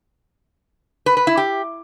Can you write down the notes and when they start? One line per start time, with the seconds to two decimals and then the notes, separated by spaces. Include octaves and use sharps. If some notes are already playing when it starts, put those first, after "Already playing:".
1.06 B4
1.17 B4
1.27 E4
1.37 G4